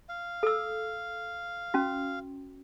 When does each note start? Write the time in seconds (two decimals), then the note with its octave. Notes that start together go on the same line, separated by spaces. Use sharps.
0.09 F5
0.43 A4 E6
1.74 C#4 F#4